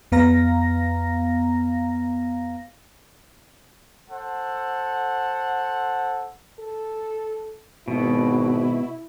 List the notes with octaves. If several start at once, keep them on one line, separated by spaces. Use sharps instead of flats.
F2 B3 F5 A#5 A#6
A4 C5 F#5
A4
G#1 B2 E4